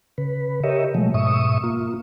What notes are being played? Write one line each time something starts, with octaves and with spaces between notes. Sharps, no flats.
C#3 B4
G4 A#4 C#5 D#5 E5
B2 F3 F#3 G#3 A3
G#2 B2 E5 C#6 D#6
A#3 F4